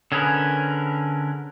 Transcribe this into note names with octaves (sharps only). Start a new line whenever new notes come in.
D3 C#4 G#4 A#4 B4